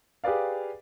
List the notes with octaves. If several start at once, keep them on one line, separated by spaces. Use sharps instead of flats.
G4 G#4 B4 D5 F5